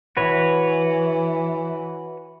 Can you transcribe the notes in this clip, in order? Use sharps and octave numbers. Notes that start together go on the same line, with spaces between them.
E3 F#4 B4 C#5